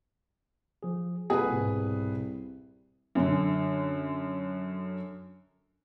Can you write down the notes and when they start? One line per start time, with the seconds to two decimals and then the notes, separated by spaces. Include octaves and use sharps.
0.83 F3 G#4
1.30 C2 A#3 F4 G#4 B4 F#5
1.51 G#2 B2
3.15 F#2 D3